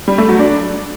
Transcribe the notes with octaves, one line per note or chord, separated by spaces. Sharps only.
G3
A3
F#3
D4